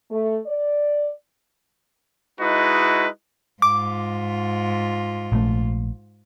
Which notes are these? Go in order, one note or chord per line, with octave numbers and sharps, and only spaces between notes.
A3
D5
G#3 D#4 E4 F#4 B4 D#5
G#2 F4 D6
A#1 A3